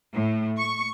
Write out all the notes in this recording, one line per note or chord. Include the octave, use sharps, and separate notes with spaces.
A2
C#6